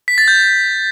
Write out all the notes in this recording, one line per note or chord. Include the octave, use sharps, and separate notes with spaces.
B6
A6
G6